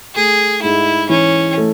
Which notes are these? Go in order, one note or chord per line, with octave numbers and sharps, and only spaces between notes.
A3 G#4
G#2 E4
E3 C#4
A3